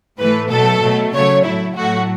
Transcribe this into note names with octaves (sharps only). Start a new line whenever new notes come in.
A2 E3 A3 B4
B2 F#3 A3 A4
B2 F#3 A3
C#3 F#3 A3 C#5
A2 F#3 A3 E4
A2 F#3 A3 F#4